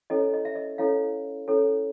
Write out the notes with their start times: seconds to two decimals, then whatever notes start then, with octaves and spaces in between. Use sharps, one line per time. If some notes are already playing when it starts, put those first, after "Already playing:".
0.10 C#4 E4 A4 C#5 D#5
0.34 D#5
0.45 E5
0.55 D#5
0.78 C#4 E4 A4 C#5 F5
1.48 C#4 E4 A4 C#5